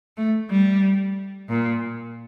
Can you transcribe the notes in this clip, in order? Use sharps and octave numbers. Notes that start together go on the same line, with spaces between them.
A3
G3
A#2